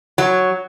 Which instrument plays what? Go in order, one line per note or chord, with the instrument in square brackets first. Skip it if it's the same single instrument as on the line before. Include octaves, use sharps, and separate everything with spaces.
[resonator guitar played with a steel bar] F#3